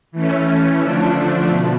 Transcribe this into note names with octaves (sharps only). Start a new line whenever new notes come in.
E3 A3 C#4
D3 F3 A3 D4
B2